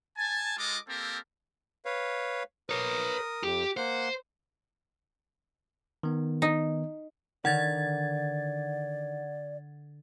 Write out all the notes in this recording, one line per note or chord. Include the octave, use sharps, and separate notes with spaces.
G#5 A5
G#3 F4 A4 D#5 D6
A#3 C4 G4 A4 A#4
B4 C#5 F5
A#4 B4 C#5 D#6
F2 G4
A#3 C5 F#5
D#3 B3
D#4
D3 D#3 D5 F#5 G#6 A6